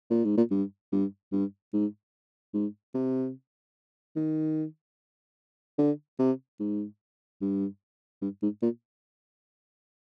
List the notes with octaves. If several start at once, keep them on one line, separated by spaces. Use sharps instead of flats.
A#2
G#2
A#2
G2
G2
G2
G#2
G#2
C3
D#3
D3
C3
G#2
G2
G2
G#2
A#2